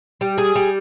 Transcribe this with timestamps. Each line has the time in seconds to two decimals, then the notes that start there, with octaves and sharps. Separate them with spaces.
0.21 G3
0.38 G#4
0.55 G3